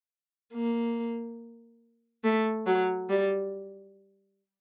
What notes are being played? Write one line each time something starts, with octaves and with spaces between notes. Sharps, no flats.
A#3
A3
F#3
G3